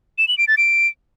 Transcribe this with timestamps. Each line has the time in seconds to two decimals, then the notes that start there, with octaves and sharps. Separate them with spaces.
0.18 E7
0.28 F#7
0.38 D7
0.48 A6
0.57 D7